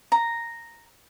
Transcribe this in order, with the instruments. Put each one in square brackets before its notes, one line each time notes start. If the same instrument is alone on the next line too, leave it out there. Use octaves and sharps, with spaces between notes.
[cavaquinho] A#5